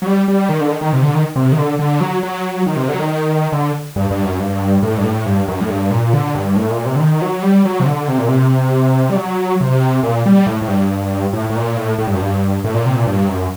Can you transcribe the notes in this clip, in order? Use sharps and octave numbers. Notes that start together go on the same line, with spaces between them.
F#3
G3
G3
D#3
D3
D#3
D#3
C3
D3
D#3
C3
D#3
D3
D3
F#3
F#3
D#3
C3
D3
F#3
D#3
D3
G2
G2
F#2
G2
A2
G2
A2
G2
F#2
A2
G2
A#2
D3
G2
A2
A#2
C3
D3
D#3
F#3
G3
F#3
C3
D3
C3
A#2
C3
G3
F#3
C3
A#2
G3
A2
A2
G2
A2
A2
A#2
A2
A2
G2
F#2
G2
A2
A#2
C3
A#2
G2
F#2